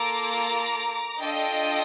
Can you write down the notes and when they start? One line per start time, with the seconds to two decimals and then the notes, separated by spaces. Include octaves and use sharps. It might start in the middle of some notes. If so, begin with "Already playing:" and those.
Already playing: A#3 F4 A4 A#5 D6
1.18 D4 F4 A4 D#5 G5